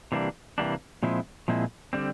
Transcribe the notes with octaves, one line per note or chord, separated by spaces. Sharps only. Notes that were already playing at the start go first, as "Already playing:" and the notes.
C3 E3 G3 A#3 D4
C3 E3 G3 A#3 D4
A#2 F3 G#3 C4 E4
A#2 F3 G#3 C4 E4
D3 G3 C4